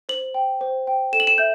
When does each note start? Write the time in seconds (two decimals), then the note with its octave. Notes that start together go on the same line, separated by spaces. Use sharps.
0.09 C5 F#7
0.34 G5
0.61 C5
0.87 G5
1.12 A4 E7
1.20 F#7
1.27 E7
1.38 E5 G6